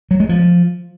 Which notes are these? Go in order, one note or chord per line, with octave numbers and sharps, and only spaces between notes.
F#3
G#3
F3